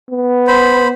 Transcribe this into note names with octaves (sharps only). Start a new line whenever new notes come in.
B3
C5 B5